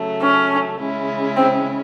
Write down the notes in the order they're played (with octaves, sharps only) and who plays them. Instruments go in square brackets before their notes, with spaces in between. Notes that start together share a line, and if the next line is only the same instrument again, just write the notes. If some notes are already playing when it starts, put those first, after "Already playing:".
Already playing: [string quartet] C#3 F#3 A3
[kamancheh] C#4
[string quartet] C#3 G#3 C#4 E4
[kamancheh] C4